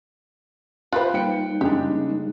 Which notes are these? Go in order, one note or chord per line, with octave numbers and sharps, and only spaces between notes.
F4 G4 B4 C5 F#6
G3 A#3 D#4 G5 C#7
C#3 G#3 D4 G4